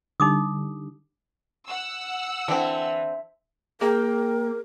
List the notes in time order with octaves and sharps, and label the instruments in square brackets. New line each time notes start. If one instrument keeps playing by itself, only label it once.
[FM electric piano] D3 G3 [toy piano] D#4 D6 D#6
[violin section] F#5 E6
[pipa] D3 C4 [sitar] E3
[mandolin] A#3 G5 [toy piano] G#4 [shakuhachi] A#4